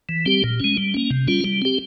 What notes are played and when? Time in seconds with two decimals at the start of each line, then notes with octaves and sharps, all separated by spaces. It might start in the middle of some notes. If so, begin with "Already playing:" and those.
0.09 E3
0.26 G3 C4 G4
0.44 A#2
0.60 G#3 C#4
0.78 G3
0.94 A#3 C#4
1.10 C3
1.28 G3 C#4 F4
1.45 G3
1.62 C4 G4